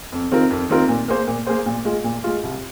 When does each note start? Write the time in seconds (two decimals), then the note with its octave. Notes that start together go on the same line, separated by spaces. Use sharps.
0.12 F2
0.31 D#3 C4 F4 A#4
0.50 F2
0.69 D#3 C4 F4 A#4
0.88 A#2
1.08 A#3 G#4 C5
1.27 A#2
1.47 A#3 G#4 C5
1.66 A#2
1.85 G#3 F4
2.04 A#2
2.24 G#3 F4
2.43 C2